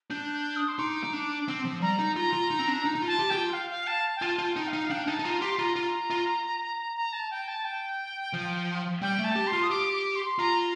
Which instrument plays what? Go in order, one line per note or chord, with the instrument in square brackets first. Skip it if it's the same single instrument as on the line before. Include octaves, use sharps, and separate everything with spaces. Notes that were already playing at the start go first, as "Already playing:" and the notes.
[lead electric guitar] D4 [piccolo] G6
[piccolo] G6
D#6
C6
[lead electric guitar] D#4 [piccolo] D6
[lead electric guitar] D#4
D4
C4
F3
[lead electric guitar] G3 [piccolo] A#5
[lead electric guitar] D#4
[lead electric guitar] F4 [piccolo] A#5
[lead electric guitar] F4
D#4
C4
D4
D#4
D#4
F4
[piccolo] A5
[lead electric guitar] G4
[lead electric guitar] G4 [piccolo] G5
[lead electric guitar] F4
[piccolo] F5
F5
A5
G5
[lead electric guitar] F4 [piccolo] A5
[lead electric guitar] F4
[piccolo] G5
[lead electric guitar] D#4
[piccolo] F5
[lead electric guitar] D#4
[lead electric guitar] D4 [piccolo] G5
[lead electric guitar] D#4 [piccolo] A5
[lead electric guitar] D#4
[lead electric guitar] F4 [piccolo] A#5
[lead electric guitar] G4 [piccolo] C6
[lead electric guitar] F4 [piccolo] A#5
[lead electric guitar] F4
F4
[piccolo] A#5
A5
G5
A5
G5
[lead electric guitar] F3
[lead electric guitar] G3 [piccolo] G5
[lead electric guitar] A3
[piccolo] A5
[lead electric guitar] G4
[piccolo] C6
[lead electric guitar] F4
[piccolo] D#6
[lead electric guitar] G4 [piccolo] D6
[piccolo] D6
C6
[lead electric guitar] F4 [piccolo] A#5